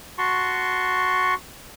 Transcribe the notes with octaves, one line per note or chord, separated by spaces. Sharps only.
F#4 A5 C6 C#6